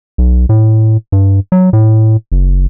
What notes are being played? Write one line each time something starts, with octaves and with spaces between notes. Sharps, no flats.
B1
A2
G2
F#3
A2
F#1